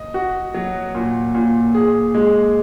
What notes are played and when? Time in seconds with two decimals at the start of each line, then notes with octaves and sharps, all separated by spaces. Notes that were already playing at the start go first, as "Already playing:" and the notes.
Already playing: D#5
0.14 F#4
0.54 F#3
0.95 A#2
1.35 A#2
1.74 G#4
2.15 G#3